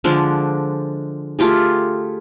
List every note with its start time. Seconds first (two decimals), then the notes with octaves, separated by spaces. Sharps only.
0.04 D3 F3 G#3 D4
1.39 A3 F4 G4 G#4